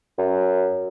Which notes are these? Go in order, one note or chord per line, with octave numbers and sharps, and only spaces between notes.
F#2